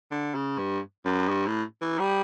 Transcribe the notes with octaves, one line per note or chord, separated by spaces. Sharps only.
D3
C#3
G2
F#2
G2
A2
E3
G3